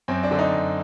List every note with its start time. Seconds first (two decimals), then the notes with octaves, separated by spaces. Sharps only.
0.08 F#2 C4
0.23 D4
0.31 D3
0.39 D#4
0.55 F#2